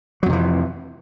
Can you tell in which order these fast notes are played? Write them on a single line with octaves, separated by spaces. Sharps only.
F#3 F2 C3 E3